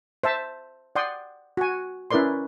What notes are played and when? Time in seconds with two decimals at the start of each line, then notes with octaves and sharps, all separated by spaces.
0.23 C5 E5 A5
0.95 D5 F#5 G5 C6 D#6
1.57 F#4 G#5
2.11 C#4 E4 A#4 B4 D5 C6